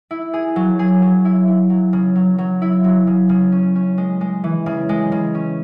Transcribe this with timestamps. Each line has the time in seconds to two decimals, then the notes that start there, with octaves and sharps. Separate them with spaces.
0.11 E4
0.34 G#4
0.56 F#3
0.79 G#4
1.02 F#3
1.25 E4
1.47 E4
1.70 F#3
1.93 C#3
2.16 F#3
2.38 F#3
2.62 E4
2.84 F#3
3.07 C#3
3.29 C#3
3.52 C#4
3.75 C#4
3.98 G#3
4.21 G#3
4.44 E3
4.66 C#3
4.89 G#3
5.12 C#3
5.35 C#4